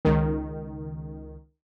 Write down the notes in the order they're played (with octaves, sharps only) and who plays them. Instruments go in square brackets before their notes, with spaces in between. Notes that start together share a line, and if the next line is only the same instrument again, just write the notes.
[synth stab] C#2 D#3